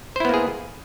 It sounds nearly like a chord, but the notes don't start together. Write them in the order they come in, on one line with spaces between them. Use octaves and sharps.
C5 E4 B3 A#3 G#4